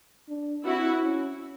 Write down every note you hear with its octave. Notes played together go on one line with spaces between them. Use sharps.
D4
C4 E4 F#4
C#4